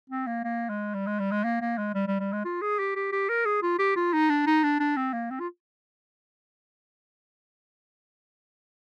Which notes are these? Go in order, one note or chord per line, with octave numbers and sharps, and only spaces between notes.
C4
A#3
A#3
G#3
G3
G#3
G3
G#3
A#3
A#3
G#3
G3
G3
G3
G#3
F4
G#4
G4
G4
G4
A#4
G#4
F4
G4
F4
D#4
D4
D#4
D4
D4
C4
A#3
C4
F4